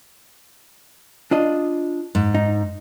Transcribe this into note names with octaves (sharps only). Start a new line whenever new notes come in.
D4 F4 D#5
G#2
D#4